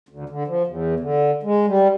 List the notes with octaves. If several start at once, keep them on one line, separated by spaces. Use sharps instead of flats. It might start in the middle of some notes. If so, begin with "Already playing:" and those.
D2
D3
F3
E2
D3
G#3
G3